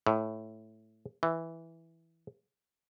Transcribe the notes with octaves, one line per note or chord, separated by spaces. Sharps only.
A2
E3